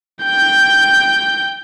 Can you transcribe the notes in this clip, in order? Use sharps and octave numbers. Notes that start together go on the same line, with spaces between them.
G5 G6